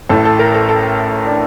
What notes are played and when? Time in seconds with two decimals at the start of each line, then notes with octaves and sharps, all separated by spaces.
0.09 A1 A2 A4
0.25 A4
0.39 A#4
0.54 A4
0.69 A4
1.27 D4